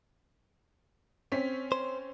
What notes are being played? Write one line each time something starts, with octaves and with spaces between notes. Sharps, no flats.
C4 C#4 B6
C5